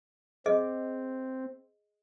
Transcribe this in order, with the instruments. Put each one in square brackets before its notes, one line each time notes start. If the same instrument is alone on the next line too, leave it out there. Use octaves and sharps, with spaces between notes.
[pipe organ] C4 [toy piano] G#4 D#5